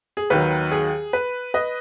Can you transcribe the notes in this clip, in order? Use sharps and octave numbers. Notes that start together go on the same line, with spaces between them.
G#4
D#2 D#3 F#3 B4
G#4
B4
B4 D#5